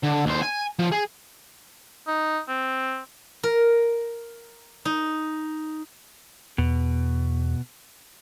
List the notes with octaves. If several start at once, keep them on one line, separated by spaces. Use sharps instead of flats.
D3
D#2 C5
G#5
F3
G#4
D#4
C4
A#4
D#4
E2 B2